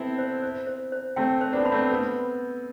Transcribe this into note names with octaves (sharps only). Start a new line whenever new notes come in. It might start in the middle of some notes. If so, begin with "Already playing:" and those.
Already playing: B3 C4 E4 A4
C5
C5
C5
C5
A3 C4 G5
C5
B3 D4
B5
A3 C4
B3 B4